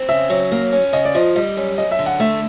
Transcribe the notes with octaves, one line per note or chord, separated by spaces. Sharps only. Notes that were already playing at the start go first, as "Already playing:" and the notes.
Already playing: C4
C#3 E5
F#3
A#3
C#4
C#3 D#5
D5
F3 D#5
G3 D#5
F#2
F#2 D#5
E5
D3
F#5
A3 E5